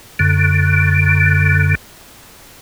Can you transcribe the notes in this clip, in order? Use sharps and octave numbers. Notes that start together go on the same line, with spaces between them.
F#2 D3